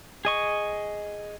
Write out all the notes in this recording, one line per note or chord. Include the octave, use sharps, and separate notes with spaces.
G#4 D#5 C#6